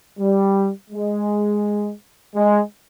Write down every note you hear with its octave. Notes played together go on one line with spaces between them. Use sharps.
G3
G#3
G#3